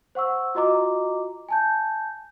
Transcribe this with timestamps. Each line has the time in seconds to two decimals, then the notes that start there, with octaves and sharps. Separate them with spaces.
0.15 C5 F#5 C#6 E6
0.55 F4 F#4 D#5 A#5 D6
1.49 G#5 A5 G6